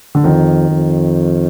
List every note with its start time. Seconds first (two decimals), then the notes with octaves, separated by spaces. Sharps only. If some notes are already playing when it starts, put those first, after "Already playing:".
0.15 D3
0.23 F2 D#3
0.71 F2